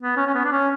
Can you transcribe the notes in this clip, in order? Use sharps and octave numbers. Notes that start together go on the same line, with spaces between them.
B3
C#4
C#4
B3
D4
C#4